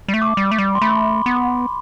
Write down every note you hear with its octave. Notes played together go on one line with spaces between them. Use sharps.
G3
A3
D6
G3
A3
G3
C6
A3 B5
B3